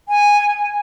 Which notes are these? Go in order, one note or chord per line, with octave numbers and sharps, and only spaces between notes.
G#5